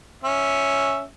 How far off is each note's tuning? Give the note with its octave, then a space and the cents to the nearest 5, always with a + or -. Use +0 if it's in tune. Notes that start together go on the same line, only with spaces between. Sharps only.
C#4 +0 E5 +0